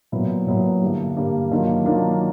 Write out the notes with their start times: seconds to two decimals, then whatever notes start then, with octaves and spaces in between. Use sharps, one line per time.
0.12 A#2 F#3 B3 E4
0.46 A#2 F#3 B3 E4
0.82 G2 D3 G3 A#3 D4
1.16 G2 D3 G3 A#3 D4
1.51 D#3 F#3 A#3 D4 F4
1.86 D#3 F#3 A#3 D4 F4